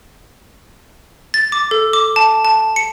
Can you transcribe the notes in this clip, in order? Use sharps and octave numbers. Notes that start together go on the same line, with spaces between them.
A6
D6
A4
D6
A5
A5
C#7